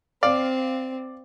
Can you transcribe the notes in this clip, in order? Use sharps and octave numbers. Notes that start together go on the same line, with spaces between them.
C4 D5 F5